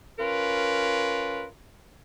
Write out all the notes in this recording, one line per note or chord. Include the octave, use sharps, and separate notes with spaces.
C#4 F4 A#4 B4